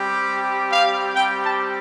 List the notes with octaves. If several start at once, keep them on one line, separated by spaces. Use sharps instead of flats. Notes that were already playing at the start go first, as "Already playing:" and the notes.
Already playing: G3 C4 G4
F5
G3 C4 G4 G5
A5